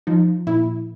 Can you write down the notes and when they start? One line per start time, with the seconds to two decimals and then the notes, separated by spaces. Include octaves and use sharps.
0.07 F3 D#4
0.47 A#2 E4